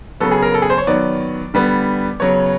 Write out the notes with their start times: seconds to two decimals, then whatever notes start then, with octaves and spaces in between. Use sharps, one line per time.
0.20 C#3 F#3 B3 A4
0.31 G#4
0.42 A#4
0.54 A4
0.62 G#4
0.70 C5
0.78 C#5
0.87 D#3 F#3 B3 D5
1.54 D3 G3 B3
2.20 C#3 F#3 B3 C#5